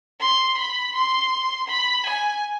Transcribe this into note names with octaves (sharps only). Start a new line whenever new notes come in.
C6
B5
C6
B5
G#5